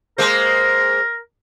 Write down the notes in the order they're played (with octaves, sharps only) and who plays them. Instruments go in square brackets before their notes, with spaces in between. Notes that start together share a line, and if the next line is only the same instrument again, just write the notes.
[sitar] G#3 A#3 C5 [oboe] A#4